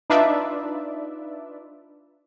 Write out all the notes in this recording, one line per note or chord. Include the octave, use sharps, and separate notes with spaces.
D4 D#4 F4 B4 D5 E5